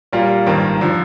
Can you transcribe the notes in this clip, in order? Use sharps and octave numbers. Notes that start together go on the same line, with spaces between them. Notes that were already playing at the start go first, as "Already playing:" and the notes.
A#2 G3 A#3 F4
G#1 G2 D#3 A#3
D3 F3